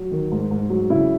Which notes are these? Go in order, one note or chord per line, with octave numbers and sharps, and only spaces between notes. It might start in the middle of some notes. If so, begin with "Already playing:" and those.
Already playing: F#3
D#3
G#2
G#2
F#3
C#3 E4